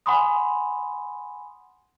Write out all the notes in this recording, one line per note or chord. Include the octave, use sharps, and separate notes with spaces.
F#5 G#5 B5 C6 D#6